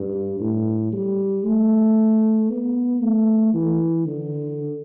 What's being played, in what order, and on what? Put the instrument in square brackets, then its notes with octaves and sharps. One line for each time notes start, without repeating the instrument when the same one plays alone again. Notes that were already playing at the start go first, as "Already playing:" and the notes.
Already playing: [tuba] G2
A2
G3
A3
B3
A3
E3
D3